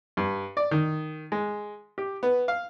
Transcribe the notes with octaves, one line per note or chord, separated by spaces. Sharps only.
G2
D5
D#3
G#3
G4
B3
F5